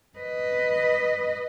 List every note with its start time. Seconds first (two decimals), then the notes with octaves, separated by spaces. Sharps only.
0.18 B4 D#5